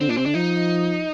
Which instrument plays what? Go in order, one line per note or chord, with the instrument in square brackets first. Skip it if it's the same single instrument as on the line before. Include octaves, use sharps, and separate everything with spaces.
[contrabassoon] D3 [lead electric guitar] C4
[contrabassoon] A#2 [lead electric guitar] D4
[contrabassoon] C3 [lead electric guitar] C4
[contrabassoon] D3 [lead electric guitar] D4
[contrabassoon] F3 [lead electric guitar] D#4